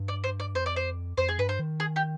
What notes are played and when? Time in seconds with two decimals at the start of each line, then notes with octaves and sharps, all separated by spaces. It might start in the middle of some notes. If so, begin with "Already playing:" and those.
Already playing: G2
0.08 D5
0.24 C5
0.40 D5
0.55 F2 C5
0.66 D5
0.76 C5
1.17 F2 C5
1.29 G#4
1.38 G2 B4
1.49 C5
1.59 D#3
1.80 G#4
1.96 G4